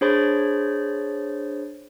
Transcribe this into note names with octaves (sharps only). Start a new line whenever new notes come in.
D4 G#4 C5 C#5 B5 A6